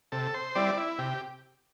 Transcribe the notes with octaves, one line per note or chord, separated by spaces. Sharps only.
C3 A4
C5
G3 C4 E4 D5
E4
C3 G4